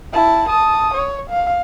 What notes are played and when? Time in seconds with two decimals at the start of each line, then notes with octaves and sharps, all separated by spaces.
0.13 E4 A5
0.49 A5 D#6
0.94 C#5
1.30 F5